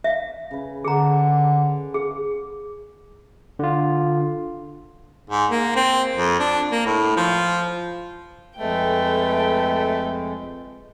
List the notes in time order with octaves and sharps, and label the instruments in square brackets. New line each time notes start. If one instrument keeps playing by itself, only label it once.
[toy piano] E5 F5
[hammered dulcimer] C#3 B4
[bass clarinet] D3 [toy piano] G#4 A#5
[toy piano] G#4 [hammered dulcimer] F5 C#6
[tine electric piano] D3 F4
[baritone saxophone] G#2
A#3
C4
F2
D4
A#3
A2
F3
[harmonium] F2 G#3 [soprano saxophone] A3 [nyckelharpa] B4 G5